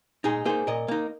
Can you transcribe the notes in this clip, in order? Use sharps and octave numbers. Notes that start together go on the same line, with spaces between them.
A#2 D#4 G#4
A#3 D#4 G#4 C5
A#2 A#4 D#5
A#3 D#4